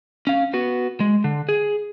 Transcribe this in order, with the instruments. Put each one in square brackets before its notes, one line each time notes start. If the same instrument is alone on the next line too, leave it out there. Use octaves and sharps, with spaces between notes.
[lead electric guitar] C#4 F5
B3 F#4
G#3
D3
G#4